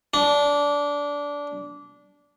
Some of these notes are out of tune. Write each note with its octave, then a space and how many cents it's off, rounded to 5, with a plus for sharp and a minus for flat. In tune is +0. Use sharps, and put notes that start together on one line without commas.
D4 -20